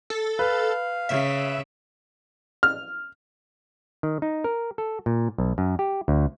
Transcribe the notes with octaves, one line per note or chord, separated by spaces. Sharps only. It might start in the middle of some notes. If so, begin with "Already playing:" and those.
A4
B4 F5
C#3 E5
F6
D#3
D#4
A#4
A4
A#2
B1
F#2
G4
D2